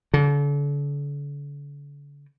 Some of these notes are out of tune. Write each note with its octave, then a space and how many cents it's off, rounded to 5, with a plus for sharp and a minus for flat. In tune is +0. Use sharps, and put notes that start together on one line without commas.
D3 -40